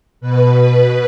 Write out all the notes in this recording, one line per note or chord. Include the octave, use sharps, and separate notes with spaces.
B2 B4
B4